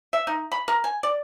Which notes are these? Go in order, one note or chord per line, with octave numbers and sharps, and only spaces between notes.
E5
D#4
B5
A#4
G#5
D5